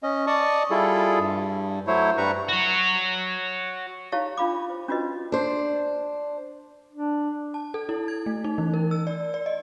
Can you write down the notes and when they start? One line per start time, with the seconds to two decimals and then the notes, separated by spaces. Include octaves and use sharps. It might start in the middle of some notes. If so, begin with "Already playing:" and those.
0.03 C#4 D#5
0.27 D5 D#5 A5 C#6 D#6
0.70 G3 E4 F4 G#4 A4
1.19 G2
1.87 F#3 A3 E4 C5 C#5
2.17 G2 G3 B4 A#5 C#6
2.49 F#4 C#5
4.12 D#4 E4 G4 C#5 F5 A5
4.37 D4 F4 F5 B5 D6
4.70 C5
4.88 C#4 D4 F4 F#4 B4 D#5
5.32 D4 C5
6.93 D4
7.54 A5
7.74 A4
7.89 E4
8.08 G#6
8.26 A3
8.44 D#4
8.58 E3
8.74 A#4
8.91 E6
9.07 D5
9.34 D5
9.46 D#5